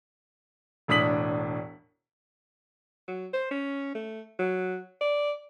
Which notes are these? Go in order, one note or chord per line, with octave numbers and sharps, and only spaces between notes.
E1 A2 D4 D#6 B6 F#7
F#3
C5
C#4
A3
F#3
D5